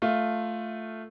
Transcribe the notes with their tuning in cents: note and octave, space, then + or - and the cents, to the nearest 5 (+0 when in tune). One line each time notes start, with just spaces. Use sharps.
A3 +0 F4 +5